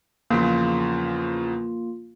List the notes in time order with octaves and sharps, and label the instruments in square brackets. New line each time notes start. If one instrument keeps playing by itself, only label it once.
[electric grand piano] E2 C#3 F3 [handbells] A#3 F4